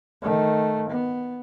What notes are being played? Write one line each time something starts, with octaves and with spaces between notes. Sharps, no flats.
D#3 A3
B3